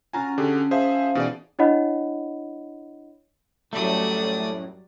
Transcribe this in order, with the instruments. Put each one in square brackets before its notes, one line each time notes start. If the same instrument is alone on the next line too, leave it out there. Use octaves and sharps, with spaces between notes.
[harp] C#4 F4 F#4 [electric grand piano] G#5 A#5
[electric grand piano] D3 G4 G#4
[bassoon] F3 [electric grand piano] G#4 C5 E5
[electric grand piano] B2 G#4 D5 [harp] E3 D#4
[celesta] D4 E4 C#5 D#5 F#5 B5
[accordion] F#2 A2 [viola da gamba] F#3 G3 [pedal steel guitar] A3 [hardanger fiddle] D5 D#6